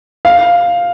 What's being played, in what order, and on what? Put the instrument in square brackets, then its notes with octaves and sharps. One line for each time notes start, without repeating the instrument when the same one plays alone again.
[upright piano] F5